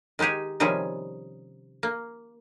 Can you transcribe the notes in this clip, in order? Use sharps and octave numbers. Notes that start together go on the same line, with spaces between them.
D#3 G#3 D#4 G4 G#4
C3 D#3 F3 G3 C#4 G#4
A#3